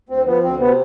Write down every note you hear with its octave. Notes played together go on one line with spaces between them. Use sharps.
D2 C4
F3 B3
D2 C4
C3 B3